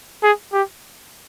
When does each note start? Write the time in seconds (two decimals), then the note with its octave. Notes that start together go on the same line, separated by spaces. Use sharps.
0.23 G#4
0.53 G4